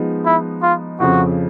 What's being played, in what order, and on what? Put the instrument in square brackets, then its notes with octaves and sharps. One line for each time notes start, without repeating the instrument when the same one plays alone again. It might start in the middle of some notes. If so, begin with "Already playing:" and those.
Already playing: [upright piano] F3 G#3 B3 D#4
[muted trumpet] E4
F4
[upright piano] F2 C#3 F3 [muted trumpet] F#4